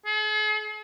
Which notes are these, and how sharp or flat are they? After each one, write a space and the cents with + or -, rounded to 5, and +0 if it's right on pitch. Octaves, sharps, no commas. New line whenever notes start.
G#4 +45